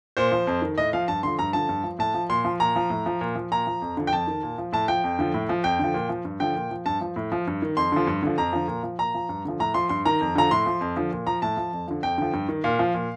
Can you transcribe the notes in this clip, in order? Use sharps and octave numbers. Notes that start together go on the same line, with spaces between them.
A#2 C5
F3
F2
D#3
A2 D#5
F3 F5
G2 A5
D3 F3 C6
G2 A#5
D3 F3 A5
G2
F3
A2 A5
F3
A#2 C6
F3
A#2 A#5
F3
A2
F3
A#2
F3
A#2 A#5
F3
F2
D3 F3
G5
F2 A5
D#3
A#2
F3
A2 A5
F3 G5
F2
D3 F3
A2
F3
F2 G5
D3 F3
A#2
F3
G2
D3 F3 G5
A#2
F3
G2 A5
F3
A2
F3
G2
D#3
F2 C6
D3 F3
G2
D3 F3
F2 A#5
D3 F3
A#2
F3
A#2 A#5
F3
G2
D3 F3
A2 A#5
F3 C6
G2 C6
D#3 A#5
F2
D3 F3 A#5
A2 C6
F3
F2
D3 F3
A#2
F3 A#5
A2 A5
F3
F2
D3 F3
F2 G5
D3 F3
G2
D#3
A#2 F5
F3
A#2